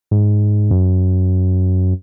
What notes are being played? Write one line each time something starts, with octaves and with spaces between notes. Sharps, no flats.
G#2
F#2